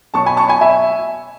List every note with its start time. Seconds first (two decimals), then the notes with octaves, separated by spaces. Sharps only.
0.14 B2 F#3 A5 C#6
0.26 G#5 B5
0.37 A5 C#6
0.48 G#5 B5
0.61 E5 G#5